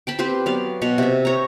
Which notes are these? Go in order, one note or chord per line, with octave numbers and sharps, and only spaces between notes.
G5 A5 B5
C4 G4 B4 C5
F#3 B3 D5 F5
B2 F#5 A#5
C3 E5
C#5 A#5